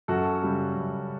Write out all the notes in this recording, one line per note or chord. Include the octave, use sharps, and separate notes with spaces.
F#2 F#4 A4
C#3 G3
F#2